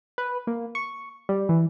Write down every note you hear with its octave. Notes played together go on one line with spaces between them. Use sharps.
B4
A#3
C#6
G3
E3